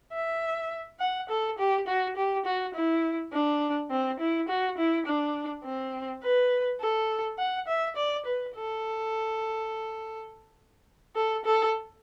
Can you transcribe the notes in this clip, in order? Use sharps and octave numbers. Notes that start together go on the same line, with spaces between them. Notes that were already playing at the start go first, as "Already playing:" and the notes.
E5
F#5
A4
G4
F#4
G4
F#4
E4
D4
C4
E4
F#4
E4
D4
C4
B4
A4
F#5
E5
D5
B4
A4
A4
A4